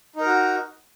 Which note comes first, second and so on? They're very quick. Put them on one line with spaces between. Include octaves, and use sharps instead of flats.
D#4 A#4 F#4